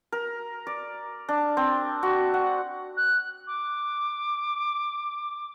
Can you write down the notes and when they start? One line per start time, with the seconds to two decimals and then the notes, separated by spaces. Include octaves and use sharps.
0.12 A#4
0.67 D5
1.29 D4
1.57 C4
2.03 F#4
2.34 F#5
2.97 F#6
3.47 D6